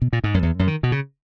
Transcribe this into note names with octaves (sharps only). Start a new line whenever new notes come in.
B2
A#2
G#2
F#2
E2
F#2
D#3
B2
C#3